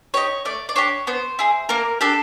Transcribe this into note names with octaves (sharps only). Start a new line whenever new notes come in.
D#4 G4 C#5
A3 D5
D5
D4 G4 C#5
B3 C5
E4 G#4
A#3 A#4
D4 G4 A4